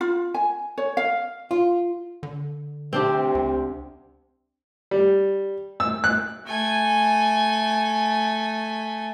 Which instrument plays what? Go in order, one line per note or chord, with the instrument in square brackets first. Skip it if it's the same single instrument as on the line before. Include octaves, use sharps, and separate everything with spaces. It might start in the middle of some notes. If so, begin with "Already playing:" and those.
[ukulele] F4
G#5
C#5
F5
[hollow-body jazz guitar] F4
[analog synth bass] D3
[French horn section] D2 C3 [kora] C4 D4 G4
[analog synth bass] C#2
[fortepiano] G3
E6
F#6
[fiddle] A3 G#5